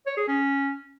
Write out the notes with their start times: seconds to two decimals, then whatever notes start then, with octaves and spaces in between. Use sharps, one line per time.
0.06 C#5
0.17 G#4
0.28 C#4